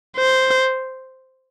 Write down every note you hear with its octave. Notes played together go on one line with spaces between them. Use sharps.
C5